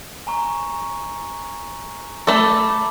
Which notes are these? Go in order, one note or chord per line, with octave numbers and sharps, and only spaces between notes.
G#5 A#5 C#6
A3 A4 A5 B5 D6